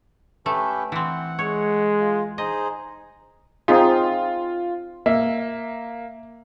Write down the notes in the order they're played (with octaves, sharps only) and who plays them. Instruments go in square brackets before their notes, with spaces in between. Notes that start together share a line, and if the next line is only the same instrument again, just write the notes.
[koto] A3 [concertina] C#4 G4 B4
[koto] E3 C4 [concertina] F#5
[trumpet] G#3 [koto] C#5
[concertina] F4
[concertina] D#4 G#4 C5 [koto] D#5
[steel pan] C4 D#4 G#4 [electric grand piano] F4
[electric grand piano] A#3 [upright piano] E5